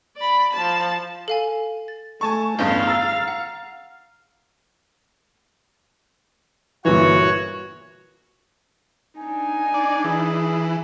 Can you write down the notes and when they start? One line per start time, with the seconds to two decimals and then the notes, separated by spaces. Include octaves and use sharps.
0.17 D5 B5
0.54 F3 A5
1.28 A4 F5 G#5
1.88 A6
2.21 A3 G#5 A5 C#6
2.59 A1 E2 G2 F5 G6
2.87 A#5 E6 A6
3.28 F#5
6.85 G1 A#2 E3 F#4 C#5
9.18 D4 D#4 G#5
9.74 D5
10.04 E3 G#4